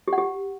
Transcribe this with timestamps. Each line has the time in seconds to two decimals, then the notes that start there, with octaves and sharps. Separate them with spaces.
0.08 G4
0.13 F#5
0.18 G4